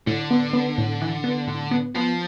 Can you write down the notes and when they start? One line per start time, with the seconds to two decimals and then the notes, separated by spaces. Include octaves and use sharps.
0.07 A2 D3
0.31 B3
0.53 B3
0.78 A2
1.02 E3
1.24 B3
1.47 A2
1.71 B3
1.95 F3 B3